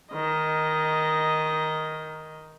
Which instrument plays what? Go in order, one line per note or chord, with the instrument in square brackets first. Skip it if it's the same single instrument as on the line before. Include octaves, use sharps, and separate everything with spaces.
[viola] D#3 D#5